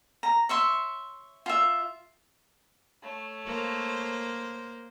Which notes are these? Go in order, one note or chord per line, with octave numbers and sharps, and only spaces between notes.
A#5
C#5 E5 C6
F4 E5
A3 C#5
A#3 C5